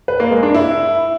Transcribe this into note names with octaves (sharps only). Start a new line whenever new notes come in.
B4
A#3
G#3
D4
E4